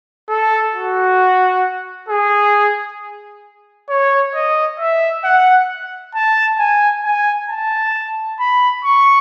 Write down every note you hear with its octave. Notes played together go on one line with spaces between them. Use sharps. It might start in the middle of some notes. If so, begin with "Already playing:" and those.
A4
F#4
G#4
C#5
D#5
E5
F#5
A5
G#5
G#5
A5
B5
C#6